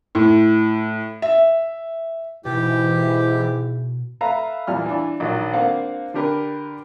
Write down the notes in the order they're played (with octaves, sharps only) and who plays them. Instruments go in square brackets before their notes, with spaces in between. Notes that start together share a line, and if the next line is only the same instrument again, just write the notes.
[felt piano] A2
E5
[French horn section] G#2 E4 [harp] B2 [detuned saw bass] E3 [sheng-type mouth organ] G4
[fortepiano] A4 B4 E5 F5 A#5
E2 A#2 G3 F6
E3 D4
A#1 D#3 F#3
A#3 C4 D4 F5 F#5
D3 D4 G4 A#4 B4